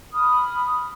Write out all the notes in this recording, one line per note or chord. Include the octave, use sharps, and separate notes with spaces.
B5 D#6 F6